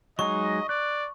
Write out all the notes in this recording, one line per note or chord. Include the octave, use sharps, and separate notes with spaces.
F#3 G#3 D#4 D#5 C#6
D5 F#6